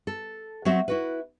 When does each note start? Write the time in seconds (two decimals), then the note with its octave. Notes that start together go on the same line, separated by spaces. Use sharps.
0.07 A4
0.65 F#3 C4 F#4 E5
0.88 E4 F#4 B4